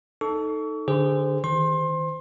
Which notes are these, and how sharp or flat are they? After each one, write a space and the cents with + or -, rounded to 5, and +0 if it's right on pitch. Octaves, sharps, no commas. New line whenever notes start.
D#4 +0 A4 +0 C#6 +35
D3 +0 G#4 -30 C5 -20
D#3 +20 C5 -20 C6 +25